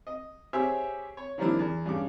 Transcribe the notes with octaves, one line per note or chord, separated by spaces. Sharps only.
D#5
G4 G#4 C5 C#5 E5
C#5
D#3 F3 G3 A#3 D4 E4
E2
G2 C#3 D6